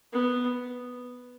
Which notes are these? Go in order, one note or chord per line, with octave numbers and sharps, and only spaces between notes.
B3